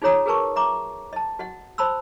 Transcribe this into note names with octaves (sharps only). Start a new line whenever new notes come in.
D#4 F4 G#4 C#5 A#5 D#6
F#4 G#4 A#4 B4 A5 C#6
E5 A#5 D6
D#5 A5
F#4 D#5 F#5
C5 A5 B5 C6 E6